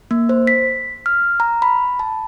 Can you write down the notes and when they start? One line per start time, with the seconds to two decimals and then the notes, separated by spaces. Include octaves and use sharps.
0.11 A#3
0.29 C5
0.47 B6
1.06 F6
1.40 A#5
1.62 B5
1.99 A5